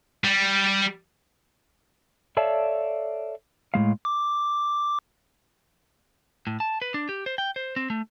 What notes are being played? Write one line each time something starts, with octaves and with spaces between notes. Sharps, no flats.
G3
A4 C#5 D5 E5 F5 A5
A2 G#3 F5
D6
A2
A5
B4
D4
G4
C5
G5
C5
C4
A3